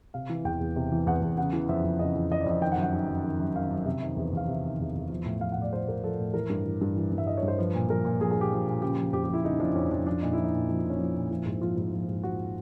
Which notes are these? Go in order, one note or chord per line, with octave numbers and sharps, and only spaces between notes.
C3 F5
E3
E2 G5
E2
C3
E3
E2 F#5
E2
C#3 F#5
E3
F2 E5
F2
C#3 D#5
E3
F2 D#5
D5
F2 D#5
D#3 G5
F#5
F#2
F#5
D#3
F#2
D#3
F#2
D#3 F5
F#2
C3 E5
D#3
E2
E2 F5
C3 E5
D#3
E2
E2
F3
A2
F3 F5
F#5
A2 D5
F3 C5
A2 A#4
F3 A4
A2
E3 A#4
G2
E3
G2
E3
G2
E5
E3 D#5
C#5
G2
C5
F3 B4
A#2
F3 A#4
A#2
F3 G#4
G#4
A#2
G4
F3
A#2
C#3 G4
F3
F2 G4
G4
F2 E4
C#3 D#4
F3 D4
F2 C#4
F2 D4
F3 D4
A#2 D#4
E4
F3
D#4
A#2
F3 D4
D4
A#2
C#4
F3 D4
A#2
F3 E4
G#2
F3 F4
G#2 F4
F3
G#2
F3 F#4